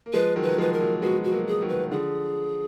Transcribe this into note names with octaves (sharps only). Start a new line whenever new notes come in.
A#3
F3 G#3 B4
D#3 F#3
B4
F#3
F3 G#3 B4
A#4
F#3 A#3
G#3 B3 F#4
F#4
F#3 A#3
G#4
D#3 F#3
B4
D3 F3 G#4